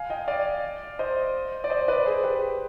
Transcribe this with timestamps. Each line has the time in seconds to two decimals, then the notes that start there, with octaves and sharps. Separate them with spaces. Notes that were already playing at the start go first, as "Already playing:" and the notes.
Already playing: F5 G#5
0.10 D#5 G5
0.28 D5 F5
0.99 C5 D#5
1.64 D5
1.70 C5 D#5
1.88 B4 D5
2.06 G#4 C5
2.24 G4 B4